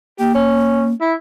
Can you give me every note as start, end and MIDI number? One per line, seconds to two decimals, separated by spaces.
0.19 0.93 58
0.19 0.29 67
0.34 0.92 61
1.01 1.14 64